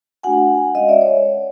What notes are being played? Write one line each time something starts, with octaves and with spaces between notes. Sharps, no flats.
A3 D4 F#4 F#5 G#5
G#3 C#4 F#4 D#5 F5
D5 E5
C#5 D#5